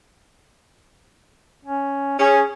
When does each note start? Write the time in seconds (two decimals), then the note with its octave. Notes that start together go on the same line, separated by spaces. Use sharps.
1.65 C#4
2.19 C#4 G#4